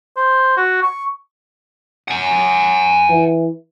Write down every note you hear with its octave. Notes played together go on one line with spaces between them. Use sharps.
C5
F#4
C#6
F#5 G#5
E3